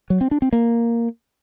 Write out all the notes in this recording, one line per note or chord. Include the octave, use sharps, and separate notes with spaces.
F#3
C4
D4
C4
A#3